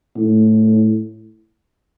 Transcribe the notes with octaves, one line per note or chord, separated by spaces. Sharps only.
A2